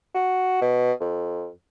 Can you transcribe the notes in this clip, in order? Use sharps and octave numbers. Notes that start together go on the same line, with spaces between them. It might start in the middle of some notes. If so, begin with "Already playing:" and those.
F#4
B2
F2